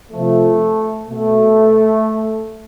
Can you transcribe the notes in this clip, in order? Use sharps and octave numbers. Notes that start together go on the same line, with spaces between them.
C3 F3 A3
B2 A3